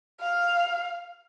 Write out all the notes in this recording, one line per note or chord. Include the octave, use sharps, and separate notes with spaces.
F5